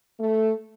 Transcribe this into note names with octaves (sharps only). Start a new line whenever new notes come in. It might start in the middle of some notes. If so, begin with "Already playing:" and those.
A3